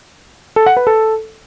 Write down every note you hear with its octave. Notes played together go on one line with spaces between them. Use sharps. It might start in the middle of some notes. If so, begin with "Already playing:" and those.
A4
F#5
B4
A4